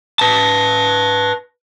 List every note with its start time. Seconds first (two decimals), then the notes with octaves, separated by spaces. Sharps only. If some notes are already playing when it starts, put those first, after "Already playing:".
0.19 B4 A5